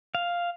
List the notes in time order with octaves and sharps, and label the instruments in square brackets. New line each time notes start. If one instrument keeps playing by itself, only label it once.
[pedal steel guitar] F5